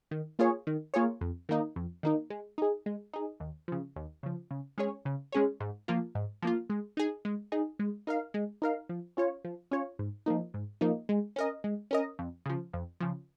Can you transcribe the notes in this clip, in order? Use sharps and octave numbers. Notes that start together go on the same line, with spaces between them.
D#3
A#3 F4 G#4 C#5
D#3
A#3 F4 G#4 C#5
F2
D#3 A#3 D#4
F2
D#3 A#3 D#4
G#3
D#4 G#4
G#3
D#4 G#4
D#2
C#3 F3
D#2
C#3 F3
C#3
G#3 C#4 G#4 C#5
C#3
G#3 C#4 G#4 C#5
G#2
F3 A#3 F4
G#2
F3 A#3 F4
G#3
D#4 G#4
G#3
D#4 G#4
G#3
D#4 A#4 F5
G#3
D#4 A#4 F5
F3
C#4 F4 C#5
F3
C#4 F4 C#5
G#2
F3 A#3 D#4
G#2
F3 A#3 D#4
G#3
C#4 A#4 D#5
G#3
C#4 A#4 D#5
F2
C#3 F3
F2
C#3 F3